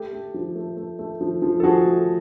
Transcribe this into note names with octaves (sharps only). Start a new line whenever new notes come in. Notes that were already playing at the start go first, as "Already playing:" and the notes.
Already playing: A3 G4 A4
A3
F3
A3
A3
A3
F3
F3
A4
F3 F#4 G#4
A3